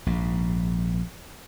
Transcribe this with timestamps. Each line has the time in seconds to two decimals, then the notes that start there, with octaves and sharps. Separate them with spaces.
0.06 A#1 G#2